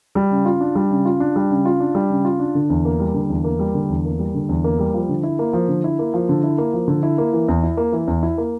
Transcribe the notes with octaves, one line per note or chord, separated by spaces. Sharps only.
G3
C#3
F4
D4
G3
C#3
F4
D4
G3
C#3
F4
D4
G3
C#3
F4
D4
D3
E2
A#3
G3
D3
E2
A#3
G3
D3
E2
A#3
G3
D3
E2
A#3
G3
F3
D3
E4
A#3
F3
D3
E4
A#3
F3
D3
E4
A#3
F3
D3
E4
A#3
E3
E2
E4
A#3
E3
E2
E4
A#3